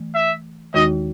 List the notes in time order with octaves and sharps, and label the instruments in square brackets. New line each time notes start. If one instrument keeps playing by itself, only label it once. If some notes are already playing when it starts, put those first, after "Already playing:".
Already playing: [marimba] E3 A3
[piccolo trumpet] E5
[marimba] D#2 D#3 G#3 D#4 F#4 [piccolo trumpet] D#5